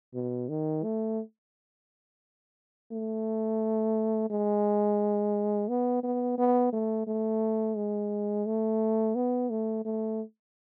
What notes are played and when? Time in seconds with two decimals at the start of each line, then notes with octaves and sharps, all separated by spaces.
0.14 B2
0.49 D#3
0.84 A3
2.91 A3
4.30 G#3
5.69 B3
6.04 B3
6.38 B3
6.73 A3
7.07 A3
7.77 G#3
8.46 A3
9.15 B3
9.50 A3
9.85 A3